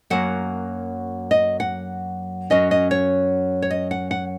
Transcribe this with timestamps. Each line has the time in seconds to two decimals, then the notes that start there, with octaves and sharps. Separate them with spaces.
0.10 F#2 F#3 A#3 F#5
1.31 D#5
1.60 F#5
2.50 F#2 F#3 C#4 D#5
2.71 D#5
2.91 C#5
3.62 C#5
3.71 D#5
3.91 F#5
4.11 F#5